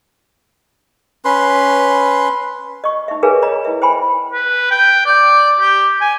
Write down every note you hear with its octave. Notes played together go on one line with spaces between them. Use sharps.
C#4 B4 C6
D#5 C#6
D#4 E5
G#4 A#4 B4 C#5 F5 G#5
C#5 D#5 A#5
E4 E5
C5 G5 G#5 B5 C6
B4
G5
D5
G4
G#5